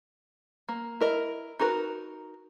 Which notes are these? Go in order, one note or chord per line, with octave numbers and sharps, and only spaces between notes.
A#3
E4 A#4 D#5
D#4 F#4 G#4 A#4 B4